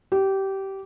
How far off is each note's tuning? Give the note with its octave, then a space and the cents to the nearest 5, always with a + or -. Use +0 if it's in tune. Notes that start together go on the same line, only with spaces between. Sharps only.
G4 -20